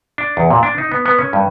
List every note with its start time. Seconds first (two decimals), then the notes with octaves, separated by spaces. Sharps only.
0.18 D4
0.37 E2
0.50 A#2
0.63 D4
0.78 D#4
0.92 B3
1.06 B3
1.19 C#4
1.33 G2